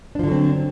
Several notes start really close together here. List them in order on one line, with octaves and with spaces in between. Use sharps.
D4 F3 D3 F#3 C4